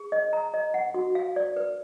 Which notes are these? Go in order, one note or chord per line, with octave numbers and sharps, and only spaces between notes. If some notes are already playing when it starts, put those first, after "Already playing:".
Already playing: G#4
D#5
A#5
D#5
F#5
F#4
F5
D5
B4